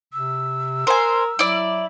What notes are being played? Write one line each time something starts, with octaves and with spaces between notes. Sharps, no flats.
C3 E6
A#4 C5 G#5
F#3 E4 D5